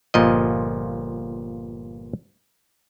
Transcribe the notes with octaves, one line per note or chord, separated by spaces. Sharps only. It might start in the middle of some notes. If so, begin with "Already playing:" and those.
G1 A#2 F3 D#5